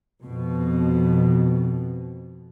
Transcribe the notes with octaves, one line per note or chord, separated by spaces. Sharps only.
F2 B2